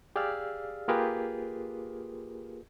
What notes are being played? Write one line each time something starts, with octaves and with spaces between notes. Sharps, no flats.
G4 G#4 D5 F5 E6 F6
A#3 F4 G4 G#4 A#4 B4